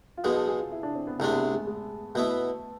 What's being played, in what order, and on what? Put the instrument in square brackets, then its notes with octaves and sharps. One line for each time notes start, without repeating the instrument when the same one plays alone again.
[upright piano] F4
[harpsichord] B1 B2 G#3 [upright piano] G#4
[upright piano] A4
G#4
F4
E4
D4
C4
B3
[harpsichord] C2 C3 G#3 D4 [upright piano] A3
[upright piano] B3
A3
G#3
G#3
[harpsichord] B2 B3 E4 [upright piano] A3